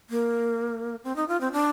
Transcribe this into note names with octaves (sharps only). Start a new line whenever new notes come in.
A#3
C4
D#4
F4
C4
D4